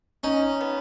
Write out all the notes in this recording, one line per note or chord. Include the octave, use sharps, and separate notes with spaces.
C#4 D#4
B3